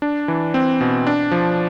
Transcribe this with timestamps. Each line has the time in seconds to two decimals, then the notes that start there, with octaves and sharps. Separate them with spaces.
0.02 D4
0.28 E3
0.54 C4
0.81 B2
1.07 D4
1.31 F3